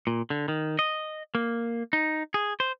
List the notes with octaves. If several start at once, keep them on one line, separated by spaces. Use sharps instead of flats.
A#2
D3
D#3
D#5
A#3
D#4
G#4
C5